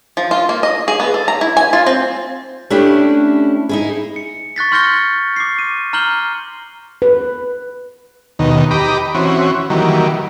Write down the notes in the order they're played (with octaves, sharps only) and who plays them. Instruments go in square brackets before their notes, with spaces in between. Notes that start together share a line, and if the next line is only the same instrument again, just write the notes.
[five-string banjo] F3
F4
A#3
D#5
G#4
B3
A4
A#5
E4
G#5
F4
C4
[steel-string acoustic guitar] A3 C#4 D4 E4 G4
D#4 E4 G#4
[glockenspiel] C#7
C#6 F#6 A6 B6
C6 F6 G6 A#6 C#7 G7
D6 C7
D#7
A#5 F6 G6 F#7 G7
[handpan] B4
[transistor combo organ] D#2 B2 D#3
G4 D#5 A#5 B5 D6
E3 C4 C#4 F#4
D#3 E3 F#3 G3 A#3